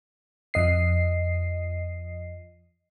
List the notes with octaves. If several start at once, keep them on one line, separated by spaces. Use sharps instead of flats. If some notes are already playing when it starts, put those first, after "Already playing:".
F2 D#5 C7